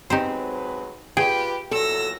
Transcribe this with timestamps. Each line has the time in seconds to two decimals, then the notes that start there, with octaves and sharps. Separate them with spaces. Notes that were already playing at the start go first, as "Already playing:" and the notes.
0.10 F#3 G#3 C4 D#4 G4 B4 C5
1.17 F4 G4 G#4 B4 G5
1.71 E2 A#2 F#3 A4 E6 A#6